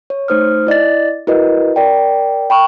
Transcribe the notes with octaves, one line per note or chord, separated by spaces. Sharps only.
C#5
A3 D#4 C5 D#6 F6
E4 D5 D#5 A6
E4 F#4 A#4 B4 D#5
A#4 D5 G5
G5 B5 C#6